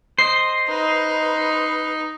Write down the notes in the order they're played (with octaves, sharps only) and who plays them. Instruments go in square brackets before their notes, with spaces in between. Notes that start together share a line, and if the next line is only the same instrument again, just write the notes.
[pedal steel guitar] C5 D#5 [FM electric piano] C7
[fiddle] D#4 [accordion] B4